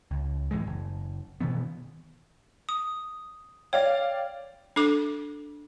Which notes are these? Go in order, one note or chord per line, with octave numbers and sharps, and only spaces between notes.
C#2
A2 E3 G#3
F#1
B2 D#3 E3 B3
D#6
C#5 D5 F5 G5
D4 A4 D6